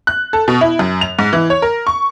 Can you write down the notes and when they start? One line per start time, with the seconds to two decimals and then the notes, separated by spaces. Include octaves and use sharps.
0.07 F#6
0.33 A4
0.48 B2
0.61 E4
0.79 F#2
1.01 F7
1.19 G#2
1.33 E3
1.50 C#5
1.62 A#4
1.87 C#6